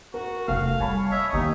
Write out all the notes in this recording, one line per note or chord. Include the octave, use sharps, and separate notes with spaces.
F#4 A#4
E1 C3 A3 A4 F5 F#5
G3 C#5 G#5 A5 B5
A3 C#5 D#5 E5
D#2 B3 D#4